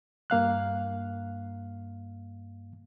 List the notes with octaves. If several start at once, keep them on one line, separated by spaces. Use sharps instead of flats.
G2 A#3 F5 F#6